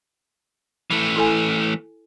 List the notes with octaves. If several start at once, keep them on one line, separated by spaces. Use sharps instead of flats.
E3 A3
E4 A4 G#5